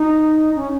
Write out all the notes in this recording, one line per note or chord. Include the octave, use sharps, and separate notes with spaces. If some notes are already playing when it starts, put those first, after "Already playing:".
Already playing: D#4
C#4